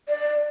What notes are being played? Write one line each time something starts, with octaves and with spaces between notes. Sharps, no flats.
D5